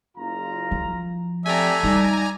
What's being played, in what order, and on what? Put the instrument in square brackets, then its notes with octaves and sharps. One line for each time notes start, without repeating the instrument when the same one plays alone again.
[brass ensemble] F#1 F4 A#5
[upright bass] F3
[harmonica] A3 E5 [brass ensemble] C4 G4 D5 [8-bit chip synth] G#5 A#5
[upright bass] G3 [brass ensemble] D#4 D5